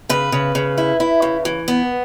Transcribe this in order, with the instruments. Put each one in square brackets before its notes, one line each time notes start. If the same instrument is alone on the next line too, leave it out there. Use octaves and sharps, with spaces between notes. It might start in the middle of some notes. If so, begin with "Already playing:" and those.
[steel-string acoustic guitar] C#3 B4
C#3
C#3
E4
E4
C#3
E3
B3